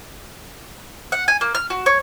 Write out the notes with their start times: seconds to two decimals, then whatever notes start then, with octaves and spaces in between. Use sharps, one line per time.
1.12 F#5
1.28 G#5
1.41 A#3
1.55 F6
1.70 F#4
1.86 C#5